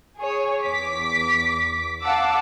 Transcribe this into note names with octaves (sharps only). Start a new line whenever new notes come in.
G#4 C#5
E2 D6 B6
F5 F#5 A5 D6 E6